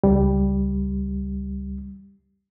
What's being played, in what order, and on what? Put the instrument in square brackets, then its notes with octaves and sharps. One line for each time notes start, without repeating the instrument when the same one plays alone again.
[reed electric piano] C#2 G3